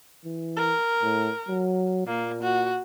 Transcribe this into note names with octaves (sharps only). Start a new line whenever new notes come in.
E3
A#4
A2
F#3
A#2 A#3
F#4